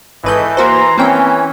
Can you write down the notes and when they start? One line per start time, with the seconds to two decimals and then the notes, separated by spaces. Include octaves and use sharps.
0.24 G#1 E3 A4 B4 C#5 D#5 G6
0.57 A#3 F#4 C5 A#5 C6
0.98 E3 A#3 C4 C#4 G5